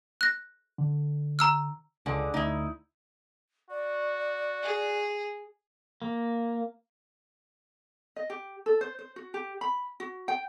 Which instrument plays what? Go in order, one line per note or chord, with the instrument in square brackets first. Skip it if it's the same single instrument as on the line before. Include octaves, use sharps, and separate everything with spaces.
[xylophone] F#6 A#6
[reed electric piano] D3
[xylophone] A#5 E6 F6
[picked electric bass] C#2 [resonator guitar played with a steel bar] D3 G#3
[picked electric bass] D2 [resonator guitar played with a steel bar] D#4 E4
[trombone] F#4 [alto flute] D5
[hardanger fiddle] G#4
[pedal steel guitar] A#3
[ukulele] D#5
G4
A4
C5
C5
F#4
G4
B5
F#4
G5